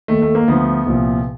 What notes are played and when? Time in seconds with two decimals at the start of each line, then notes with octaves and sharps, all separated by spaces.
0.08 D#2 D#3 A3
0.22 A3
0.35 A#3
0.48 D2 D3 F3 B3
0.86 C2 A#2 F3